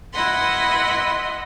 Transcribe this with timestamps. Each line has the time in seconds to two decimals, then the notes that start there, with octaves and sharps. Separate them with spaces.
0.12 E4 D#5 F#5 B5 C6